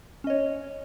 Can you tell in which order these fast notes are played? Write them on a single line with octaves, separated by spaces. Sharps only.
C#4 D#5 C#5